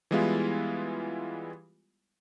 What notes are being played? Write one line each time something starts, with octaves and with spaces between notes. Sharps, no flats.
E3 G3 G#3 B3 E4 F4